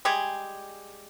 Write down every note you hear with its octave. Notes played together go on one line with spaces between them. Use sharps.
G3 G#3 G4 G#4